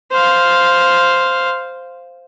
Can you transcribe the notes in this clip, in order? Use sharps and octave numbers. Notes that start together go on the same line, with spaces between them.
C5 F5